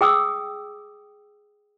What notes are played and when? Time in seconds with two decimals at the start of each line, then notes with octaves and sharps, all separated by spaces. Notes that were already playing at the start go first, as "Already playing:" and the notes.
0.01 G#4 G5 D#6 E6